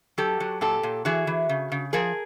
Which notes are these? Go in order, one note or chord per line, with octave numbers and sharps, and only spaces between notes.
F#3 G4 A4
F#3
A#2 G4 A4
A#2
E3 F#4 G#4
E3
C#3
C#3
F3 G#4 A#4